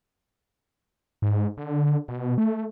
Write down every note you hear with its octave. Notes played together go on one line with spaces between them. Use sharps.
G#2
D3
B2
A3